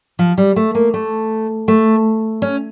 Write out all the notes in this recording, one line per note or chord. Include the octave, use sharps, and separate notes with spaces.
F3
G3
A3
A#3
A3
A3
C#4